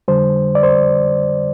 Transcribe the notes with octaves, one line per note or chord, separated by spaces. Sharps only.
F2 D3 G3 C5
D5
C5